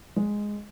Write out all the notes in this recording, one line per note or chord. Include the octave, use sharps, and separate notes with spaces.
G#3